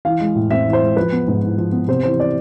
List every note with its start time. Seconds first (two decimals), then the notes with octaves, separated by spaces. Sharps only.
0.05 E3 F5
0.21 G#3
0.35 A2
0.51 C4 E5
0.66 E3
0.73 C5
0.81 G#3
0.97 F3 B4
1.12 B3
1.28 G#2
1.43 E4
1.58 F3
1.72 B3
1.88 C3 C5
2.03 E3 C5
2.19 D5